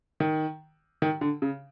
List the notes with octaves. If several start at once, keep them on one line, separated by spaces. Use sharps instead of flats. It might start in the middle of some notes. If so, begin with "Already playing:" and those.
D#3
D#3
D3
C#3